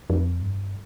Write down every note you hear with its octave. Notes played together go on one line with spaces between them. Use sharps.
F2
G2